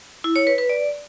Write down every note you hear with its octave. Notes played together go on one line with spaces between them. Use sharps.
E4
C#5
B4
B4
D5